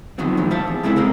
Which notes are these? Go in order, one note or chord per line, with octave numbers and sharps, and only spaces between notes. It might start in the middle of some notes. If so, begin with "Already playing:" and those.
B2 D3 D#3 F3 F#3 C4
A2 F3 G3
C5 E5 F5 A5
E2
C#3 G#3 C4 E4 G4 A4
A#2 G#3 A#3 C4